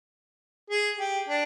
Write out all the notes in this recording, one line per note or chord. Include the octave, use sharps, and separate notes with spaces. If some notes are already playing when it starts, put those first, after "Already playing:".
G#4
G4
D4